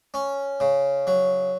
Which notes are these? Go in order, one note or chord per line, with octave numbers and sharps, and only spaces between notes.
C#4
C#3
F#3